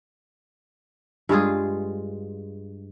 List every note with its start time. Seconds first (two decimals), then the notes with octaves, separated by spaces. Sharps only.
1.29 G2 G#3 F4 G#4